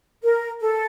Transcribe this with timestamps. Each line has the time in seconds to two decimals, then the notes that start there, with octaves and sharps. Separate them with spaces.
0.23 A#4
0.60 A4